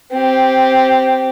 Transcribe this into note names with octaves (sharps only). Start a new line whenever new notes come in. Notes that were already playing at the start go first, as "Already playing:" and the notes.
C4 G4